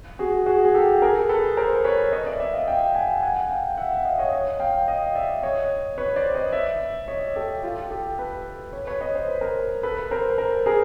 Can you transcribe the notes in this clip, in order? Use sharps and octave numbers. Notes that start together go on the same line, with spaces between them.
F#4 G#4
F#4 G#4
G#4
G4 A4
G#4 A#4
A4 B4
A#4 C5
B4 C#5
C#5 D#5
D5 E5
D5 E5
D#5 F5
F5 G5
F#5 G#5
F#5 G#5
F5 G5
E5 F#5
E5 F#5
D#5 F5
C#5 D#5
C#5 D#5
F5 G5
D#5 F5
D5 E5
C#5 D#5
B4 C#5
C5 D5
C#5 D#5
D5 E5
C#5 D#5
G4 A4
F4 G4
G4 A4
A4 B4
B4 C#5
B4 C#5
C#5 D#5
C5
B4
A#4 C5
A4 B4
A#4 C5
A#4 C5
G#4 A#4